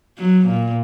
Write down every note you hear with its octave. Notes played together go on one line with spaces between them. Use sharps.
F#3
A#2